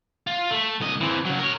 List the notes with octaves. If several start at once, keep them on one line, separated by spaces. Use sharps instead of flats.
F4
A3
C2 D#5
E3 C4
C#3 F#3
A#4 C#5